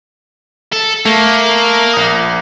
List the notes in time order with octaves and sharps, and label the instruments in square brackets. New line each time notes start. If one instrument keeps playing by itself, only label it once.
[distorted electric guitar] A4
[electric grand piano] A3 [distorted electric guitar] A#3
[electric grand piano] A#1 D#6